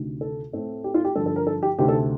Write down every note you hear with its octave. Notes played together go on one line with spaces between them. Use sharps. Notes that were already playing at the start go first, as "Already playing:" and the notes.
Already playing: D2 C3 D#3
A4
A2 A3 C4
G4
F4
G4
G2 D3 F3 A4
A4
A#4
A4
G4
D2 C3 D#3 A3 C4 G4
A4